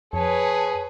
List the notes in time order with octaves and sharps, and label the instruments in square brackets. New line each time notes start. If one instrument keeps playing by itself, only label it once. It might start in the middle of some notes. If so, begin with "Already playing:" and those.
[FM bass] F2 [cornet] G#4 [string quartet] B4 C#5 [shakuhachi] A5